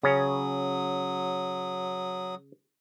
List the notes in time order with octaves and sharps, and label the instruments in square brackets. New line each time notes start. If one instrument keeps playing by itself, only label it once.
[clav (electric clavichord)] C#3 C#4 [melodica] F#3 D#6